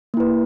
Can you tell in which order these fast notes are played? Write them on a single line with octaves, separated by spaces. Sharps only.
A#3 E4 B4